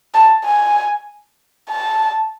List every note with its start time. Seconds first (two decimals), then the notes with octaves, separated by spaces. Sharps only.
0.15 A5
0.45 G#5
1.70 A5